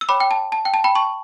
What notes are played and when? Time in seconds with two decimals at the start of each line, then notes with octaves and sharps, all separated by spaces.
0.01 E6
0.09 C#5 G5 B5 D6
0.20 G5
0.31 A5
0.52 A5
0.65 G5
0.74 A5
0.84 G5 B5
0.95 A5 C#6